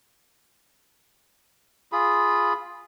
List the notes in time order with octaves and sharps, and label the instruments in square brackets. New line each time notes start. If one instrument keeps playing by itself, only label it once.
[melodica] F4 G#4 B5